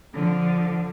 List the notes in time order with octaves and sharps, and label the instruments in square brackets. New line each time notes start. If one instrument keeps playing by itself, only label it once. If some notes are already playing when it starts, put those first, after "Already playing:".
[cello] D3 F3